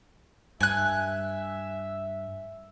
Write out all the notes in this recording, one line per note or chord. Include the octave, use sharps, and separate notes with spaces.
G2 E5 G#5 F#6